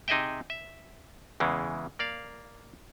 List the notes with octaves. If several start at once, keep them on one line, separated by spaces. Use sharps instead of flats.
C3 D#4 G#4 D#5 E5 G5
E5
E2 C#3 E3 G#3
A#3 D5 F5